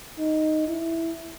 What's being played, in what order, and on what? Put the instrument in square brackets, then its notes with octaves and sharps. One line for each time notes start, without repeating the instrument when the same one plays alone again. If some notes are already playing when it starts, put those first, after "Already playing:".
[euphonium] D#4
E4